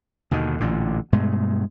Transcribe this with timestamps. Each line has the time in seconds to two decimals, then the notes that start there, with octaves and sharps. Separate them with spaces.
0.31 D#2 B2 D3 D#3
0.60 A1 A#2 D3
1.12 G2 B2 G#3 A3